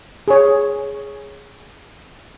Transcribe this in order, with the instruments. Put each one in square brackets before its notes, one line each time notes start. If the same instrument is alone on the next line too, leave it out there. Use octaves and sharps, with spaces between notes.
[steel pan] G#4 C#5